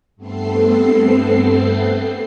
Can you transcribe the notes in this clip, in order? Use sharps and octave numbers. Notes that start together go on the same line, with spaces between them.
G2 A3 B3 C4 A4 C7